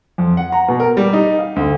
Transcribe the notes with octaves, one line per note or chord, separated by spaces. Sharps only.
F2
F#5
A#5
B2
A#4
G3
D#4
F5
D2